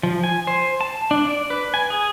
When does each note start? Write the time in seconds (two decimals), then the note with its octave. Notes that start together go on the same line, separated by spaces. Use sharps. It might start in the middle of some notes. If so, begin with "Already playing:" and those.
0.03 F3
0.24 G#5
0.47 C5
0.81 A5
1.11 D4
1.26 D5
1.50 B4
1.74 G#5
1.90 G#4